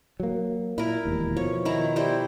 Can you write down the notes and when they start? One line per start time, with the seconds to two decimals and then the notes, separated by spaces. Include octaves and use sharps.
0.20 F#3 A#3
0.78 A#2 E4 A#4
1.05 E1 D#2
1.37 B2 F3 C#5
1.65 D#3 E4 A#5
1.96 G3 E4 C5